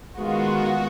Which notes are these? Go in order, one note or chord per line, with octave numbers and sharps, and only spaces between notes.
D#3 G#3 B3 F4 F#4